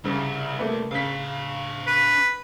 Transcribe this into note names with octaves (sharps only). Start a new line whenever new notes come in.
C2 G2 C#3
A3 A#3 B4
C#3 D4 F5 B6
B4